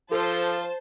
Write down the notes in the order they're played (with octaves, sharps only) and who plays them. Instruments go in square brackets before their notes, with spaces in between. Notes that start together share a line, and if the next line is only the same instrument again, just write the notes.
[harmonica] F3 F4 [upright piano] A4 [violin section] C5 A5